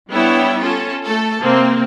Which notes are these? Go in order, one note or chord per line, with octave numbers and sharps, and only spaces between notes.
G3 B3 D4 E4 C#5 G5
C#4 F4 A4
A3 A4
C3 A#3 C4